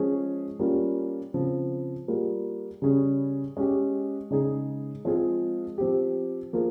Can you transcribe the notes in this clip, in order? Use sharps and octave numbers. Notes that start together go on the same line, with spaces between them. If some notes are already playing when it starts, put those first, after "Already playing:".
Already playing: F3 G#3 C#4 G#4
G3 A#3 C#4 F4
C#3 F3 C4
G3 A#3 F4 G#4
C#3 G3 C#4 G#4
G#3 C#4 G4
C#3 G#3 D#4 G#4
F3 G#3 C4 F4 G#4
F3 C4 G4
F3 A#3 F4 G#4